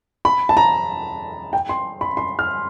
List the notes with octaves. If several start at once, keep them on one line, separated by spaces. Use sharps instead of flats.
B5
A5
A#5
G5
C6
B5
C6
F6